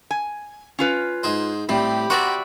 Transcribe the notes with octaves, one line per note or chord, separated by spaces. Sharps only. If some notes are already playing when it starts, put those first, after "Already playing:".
G#5
C#4 F4 B4
G#2 G#4 C5
A2 G3 C4 G4 B5
F#4 C5 D5 E5 F#5 A#5